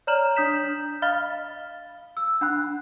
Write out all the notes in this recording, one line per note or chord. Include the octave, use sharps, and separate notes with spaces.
C#5 D5 A#5 F6 E7 F#7
D4 D#6 G6 B6 E7
D#5 F5 B5 F6 A6 G7
E6
D4 F#5 B5 F#6